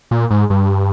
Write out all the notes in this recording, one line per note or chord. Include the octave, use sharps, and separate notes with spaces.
A#2
G#2
G2